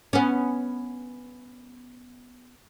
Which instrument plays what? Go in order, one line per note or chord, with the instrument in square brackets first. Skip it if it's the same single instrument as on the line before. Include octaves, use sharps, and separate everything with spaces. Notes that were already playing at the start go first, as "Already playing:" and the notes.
[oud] B3 C#4